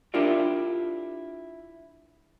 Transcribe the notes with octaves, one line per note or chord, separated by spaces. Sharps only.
D4 E4 F4 G4 A#4 D5